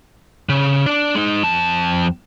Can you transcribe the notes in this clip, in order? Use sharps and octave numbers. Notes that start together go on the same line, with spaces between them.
C#3
D4 D5
G#3 D#4
F2 A5